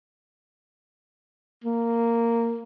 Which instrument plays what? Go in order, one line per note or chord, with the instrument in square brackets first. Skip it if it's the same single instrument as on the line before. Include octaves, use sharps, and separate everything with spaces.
[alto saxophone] A#3